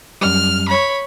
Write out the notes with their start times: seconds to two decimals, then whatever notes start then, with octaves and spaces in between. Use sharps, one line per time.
0.21 F#2 G3 F6
0.68 C#5 B5